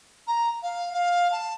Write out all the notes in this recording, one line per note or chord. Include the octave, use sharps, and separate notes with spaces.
A#5
F5
F5
A5